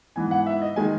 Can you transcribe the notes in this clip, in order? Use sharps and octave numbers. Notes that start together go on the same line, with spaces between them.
G#2 E3 B3 G#5
F#5
E5
D#5
D#3 G#3 G#5